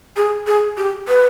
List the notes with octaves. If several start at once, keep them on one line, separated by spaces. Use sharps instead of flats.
G#4
G#4
G4
B4